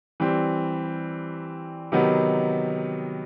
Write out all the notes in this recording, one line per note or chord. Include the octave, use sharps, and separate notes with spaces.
E3 G3 C4
C3 D#3 F#3 B3 D#4